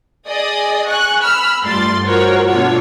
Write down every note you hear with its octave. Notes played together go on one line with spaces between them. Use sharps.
G#4 D5 D#5 D#6
G#5 C#6 F#6
B5 E6 F6
G2 A3 F4 D5 C6 A6
F4 F#4 A#4 C5 C#5 F#5
B2 A3 D4 F4 C#5